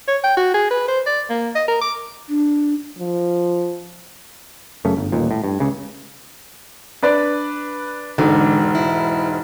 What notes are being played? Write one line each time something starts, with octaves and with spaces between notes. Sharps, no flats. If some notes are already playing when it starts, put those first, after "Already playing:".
C#5
G5
F#4
G#4
B4
C5
D5
A#3
D#5
A#4
D6
D4
F3
F#2 C#3 A3
G1
D#1 A1 D#2 A#2
A2
G2
C#2 C#3
D4 B4 D5
E1 G#2 D3
E4